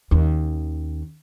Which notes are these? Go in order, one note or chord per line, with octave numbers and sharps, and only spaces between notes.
D#2 C#4